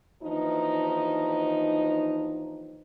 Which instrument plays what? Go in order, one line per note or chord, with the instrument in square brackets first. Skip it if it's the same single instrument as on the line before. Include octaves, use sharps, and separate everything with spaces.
[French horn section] D#2 E3 F3 D4 D#4